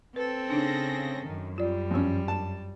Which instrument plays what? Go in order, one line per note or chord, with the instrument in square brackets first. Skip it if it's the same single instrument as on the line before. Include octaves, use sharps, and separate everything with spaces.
[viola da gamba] C4 A4 [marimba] B4
[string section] C#3 G#4 A#6 [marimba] D4 D#4
[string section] F#2 [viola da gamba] D#3
[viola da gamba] G3 [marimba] F4 D5
[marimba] G2 E6 [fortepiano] F3 C#4
[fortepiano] A5